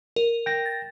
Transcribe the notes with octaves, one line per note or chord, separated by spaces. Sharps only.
A#4
G5 A#6
A6